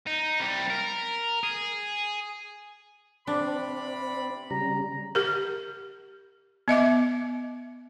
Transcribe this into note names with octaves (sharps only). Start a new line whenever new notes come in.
D#4
C2 G3
A#4
G#4
C3 C4 D4 D5 B5
C#3 G3 A#5
G4 A#4
B3 D#5 E5 D6